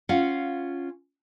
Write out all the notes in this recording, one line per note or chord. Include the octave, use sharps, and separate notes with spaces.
C#4 F4 F5 F#5